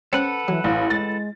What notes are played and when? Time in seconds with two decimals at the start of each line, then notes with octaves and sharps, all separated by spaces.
0.13 C4 C#4 A4 B4 F#5
0.48 E3 F#3
0.64 A1 F5
0.90 G#3 A6